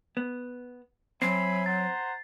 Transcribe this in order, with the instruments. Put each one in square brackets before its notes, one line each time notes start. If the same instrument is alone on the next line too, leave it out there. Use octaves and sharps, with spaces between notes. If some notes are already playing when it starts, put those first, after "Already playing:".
[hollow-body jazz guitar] B3
[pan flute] F#3 [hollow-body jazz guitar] C4 [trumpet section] E5 G#5 B5 [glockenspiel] C7
[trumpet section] C5 F#5 A#5 [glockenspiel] A6